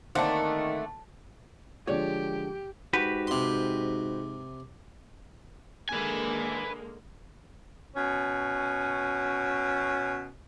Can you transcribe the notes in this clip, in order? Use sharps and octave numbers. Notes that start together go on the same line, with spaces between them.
D3 D#3 A3 A#3 C4 D4 F#5
D3 F3 G#3 G4 C#5 D5
G#2 F#4 G4 B4
C3 C6
D3 G#3 A#3 B4 G#5
B2 C#4